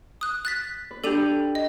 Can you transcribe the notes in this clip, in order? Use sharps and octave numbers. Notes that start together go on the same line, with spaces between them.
D#6 F#6
F#6 A6 B6
B4
D4 G4 A4 D#7 F7
D#5